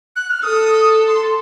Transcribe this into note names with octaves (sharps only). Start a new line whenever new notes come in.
F#6
F6
A4 D#6
C6